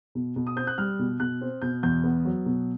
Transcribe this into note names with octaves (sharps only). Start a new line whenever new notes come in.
B2
B2
D#6
C4 G6
F#6
G3 F6
B2
B2 F#6
C4
B2 G6
E2 G6
B3
F#3
B2